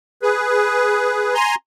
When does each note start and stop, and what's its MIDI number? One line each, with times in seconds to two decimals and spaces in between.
0.22 1.34 68
0.22 1.34 71
1.34 1.55 80
1.34 1.55 82
1.34 1.55 84